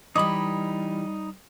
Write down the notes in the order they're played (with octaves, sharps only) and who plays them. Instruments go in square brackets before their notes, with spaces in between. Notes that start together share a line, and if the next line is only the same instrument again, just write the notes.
[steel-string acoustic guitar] E3 G4 [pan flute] G3 [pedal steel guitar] D#4 B5 [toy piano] D#5 D6 D#6